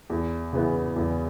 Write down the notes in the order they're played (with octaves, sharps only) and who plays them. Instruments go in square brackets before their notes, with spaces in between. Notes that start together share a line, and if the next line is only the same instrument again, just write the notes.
[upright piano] E2
C#3 E3 B3
E2